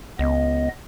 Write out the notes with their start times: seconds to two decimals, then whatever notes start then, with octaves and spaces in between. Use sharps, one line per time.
0.19 C#2 B3 D#5